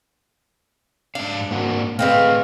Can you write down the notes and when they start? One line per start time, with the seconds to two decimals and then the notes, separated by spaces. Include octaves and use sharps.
1.15 G#2 D4 F5
1.51 G#2 A#3 F#4
1.99 A2 D3 G#3 C4 B4 F5